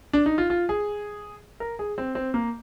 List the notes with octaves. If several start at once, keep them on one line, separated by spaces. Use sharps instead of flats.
D4
D#4
F4
F4
G#4
A#4
G#4
C4
C4
A#3